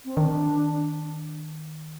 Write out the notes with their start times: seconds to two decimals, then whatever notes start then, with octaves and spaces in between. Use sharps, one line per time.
0.05 C4
0.16 D#3 D4